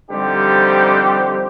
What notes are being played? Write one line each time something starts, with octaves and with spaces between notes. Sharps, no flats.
D3 F3 G3 C4 D#4 G4